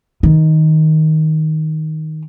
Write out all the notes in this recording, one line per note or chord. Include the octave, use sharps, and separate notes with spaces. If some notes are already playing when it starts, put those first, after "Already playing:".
D#3